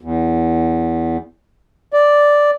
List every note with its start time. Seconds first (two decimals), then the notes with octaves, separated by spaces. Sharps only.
0.01 E2
1.93 D5